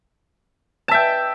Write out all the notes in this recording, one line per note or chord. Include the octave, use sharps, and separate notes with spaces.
E5 G5 A5